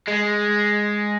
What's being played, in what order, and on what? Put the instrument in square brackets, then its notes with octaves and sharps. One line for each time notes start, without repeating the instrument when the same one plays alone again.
[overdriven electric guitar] G#3